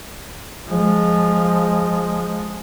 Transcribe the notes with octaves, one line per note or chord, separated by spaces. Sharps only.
F3 G#3